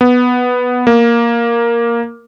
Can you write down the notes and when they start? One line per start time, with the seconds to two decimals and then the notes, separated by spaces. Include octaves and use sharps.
0.01 B3
0.87 A#3